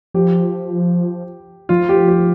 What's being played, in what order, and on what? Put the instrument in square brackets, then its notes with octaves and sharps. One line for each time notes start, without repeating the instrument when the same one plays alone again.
[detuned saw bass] F3 [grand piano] G4
[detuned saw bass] F3 [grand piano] F4
[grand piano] G4
G4